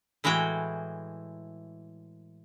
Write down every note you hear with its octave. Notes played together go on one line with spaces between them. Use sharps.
A2 E3 G#3 F#4 G5